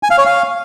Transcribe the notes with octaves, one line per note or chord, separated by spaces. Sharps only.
G#5
F5
C#5
F5